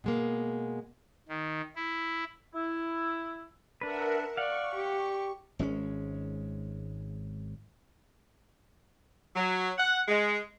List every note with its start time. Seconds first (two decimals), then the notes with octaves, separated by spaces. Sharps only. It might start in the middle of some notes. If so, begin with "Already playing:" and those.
0.04 B2 G#3 A#3
1.29 D#3
1.75 E4
2.55 E4
3.81 D4 A#4 B4 E5 F#5
4.37 D5 F5 F#5 C#6
4.75 G4
5.59 G#1 G#3 C4 C#4
9.36 F#3
9.78 F#5
10.08 G#3